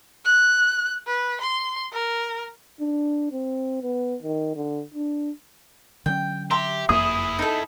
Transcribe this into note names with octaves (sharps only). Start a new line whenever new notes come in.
F#6
B4
C6
A#4
D4
C4
B3
D#3
D3
D4
D3 F#3 C#4 G5
G4 E5 A#5 C6
F#1 F2 A#3 E4 G#4 D#6
D#4 A4